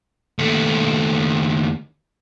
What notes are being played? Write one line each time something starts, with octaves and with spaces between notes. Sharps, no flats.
D#2 A3